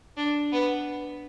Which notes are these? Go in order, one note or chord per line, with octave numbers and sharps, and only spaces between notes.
D4
B3